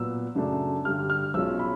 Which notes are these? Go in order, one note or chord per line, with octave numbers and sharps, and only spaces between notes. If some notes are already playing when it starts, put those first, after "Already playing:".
Already playing: A#2 F#3 B3 E6
F#2 C#3 F#3 A3 D4
G2 D3 G3 F6
F6
B1 B2 G#3 C#4 F4 E6
B5